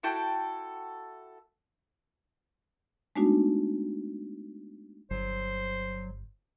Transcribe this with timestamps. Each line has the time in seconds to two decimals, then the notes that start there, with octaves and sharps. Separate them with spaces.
0.03 E4 F#4 A4 G5
3.16 G#3 A3 B3 D4 D#4 F#4
5.11 G1 F#3 C5